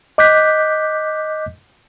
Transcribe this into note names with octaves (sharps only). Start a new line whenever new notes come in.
D#5 D6 F#6 G6 B6